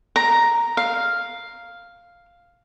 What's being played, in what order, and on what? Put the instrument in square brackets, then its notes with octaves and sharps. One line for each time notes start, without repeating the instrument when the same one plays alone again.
[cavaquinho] A#5
F5